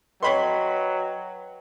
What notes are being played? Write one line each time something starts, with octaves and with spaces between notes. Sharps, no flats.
F#3 B4 C#5 D#5 G5 B5 C6